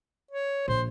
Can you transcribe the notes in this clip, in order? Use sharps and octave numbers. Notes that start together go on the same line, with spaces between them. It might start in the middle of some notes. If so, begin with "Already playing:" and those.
C#5
A#1 C5